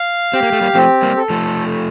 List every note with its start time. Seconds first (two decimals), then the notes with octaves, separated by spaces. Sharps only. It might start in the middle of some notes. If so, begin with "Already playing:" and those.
Already playing: F5
0.33 C4 G4
0.43 A#3
0.52 A3
0.61 G3 A#3
0.75 F3 A3 C4
1.02 G3 A#3
1.17 A4
1.30 F3 A3